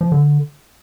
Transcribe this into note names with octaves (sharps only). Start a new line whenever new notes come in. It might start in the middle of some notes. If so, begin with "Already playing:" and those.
F3
D3